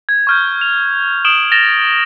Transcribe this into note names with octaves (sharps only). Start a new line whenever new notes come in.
G#6
C#6 F6 G6
F7
D#6 D7 E7 F#7 G7
A6 A#6 E7 F7 G7